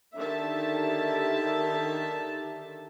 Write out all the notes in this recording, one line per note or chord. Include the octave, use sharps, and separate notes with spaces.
D3 D#3 G4 E5 A5